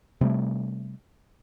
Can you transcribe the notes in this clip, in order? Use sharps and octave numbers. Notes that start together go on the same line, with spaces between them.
C3 G3 A3